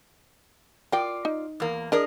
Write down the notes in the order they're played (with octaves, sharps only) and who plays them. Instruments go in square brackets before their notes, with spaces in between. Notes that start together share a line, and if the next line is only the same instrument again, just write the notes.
[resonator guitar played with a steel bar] F4 D5 [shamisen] A#4 G5
[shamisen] D#4
[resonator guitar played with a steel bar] E2 A#3
[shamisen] D4 [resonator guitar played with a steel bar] G#4 A#4 D#5